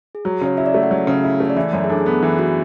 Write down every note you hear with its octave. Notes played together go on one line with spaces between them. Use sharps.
G#4
F#3 F#4
C#3 C#5
E4 E5
D5
A3 C#5
F#5
F#3
C#3
E4
A3
D5
E3 E5
F#2 C#5
G#4
D4 A4
G#4
B3 A4
E3 G#4
F#4